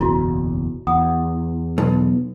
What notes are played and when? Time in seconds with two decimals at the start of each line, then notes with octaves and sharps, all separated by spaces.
0.01 F#1 B1 E2 E4 F#4
0.87 E2 F#5 D#6
1.78 B1 A4